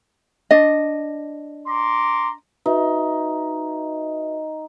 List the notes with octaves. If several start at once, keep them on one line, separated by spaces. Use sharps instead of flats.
D4 D#5
A#5 C6 D6
D#4 F#4 B4 E5